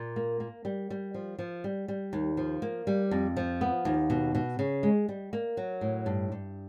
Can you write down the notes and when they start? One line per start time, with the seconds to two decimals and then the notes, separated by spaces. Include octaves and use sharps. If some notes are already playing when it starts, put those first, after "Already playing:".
Already playing: A#2
0.16 A#3
0.40 A#3
0.65 G3
0.90 G3
1.14 F3
1.39 F3
1.64 G3
1.88 G3
2.13 D#2
2.37 F3
2.62 A#3
2.87 G3
3.11 F2
3.37 F3
3.61 B3
3.85 D#2
4.10 B2
4.35 B2
4.59 C#3
4.83 G#3
5.09 G3
5.33 A#3
5.57 F#3
5.81 A2
6.06 G2
6.32 G2